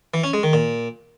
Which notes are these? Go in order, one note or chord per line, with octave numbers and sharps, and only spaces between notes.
E3
C#4
G#3
D#3
A#2